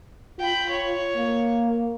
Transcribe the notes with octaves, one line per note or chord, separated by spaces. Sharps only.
F4 G5 B5
C#5
A#3